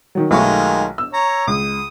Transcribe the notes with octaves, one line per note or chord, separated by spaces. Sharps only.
D#3 F#3
B1 D#3 G#3 A3 F4 C#6
E6
C#5 A#5
C#2 D#6